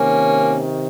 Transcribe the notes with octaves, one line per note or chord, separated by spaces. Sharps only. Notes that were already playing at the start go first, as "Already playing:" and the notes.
Already playing: C3 D#3 A#3 C#4